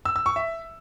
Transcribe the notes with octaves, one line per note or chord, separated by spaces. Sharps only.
E6
E6
C#6
E5